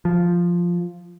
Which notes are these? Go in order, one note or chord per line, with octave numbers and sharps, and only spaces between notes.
F3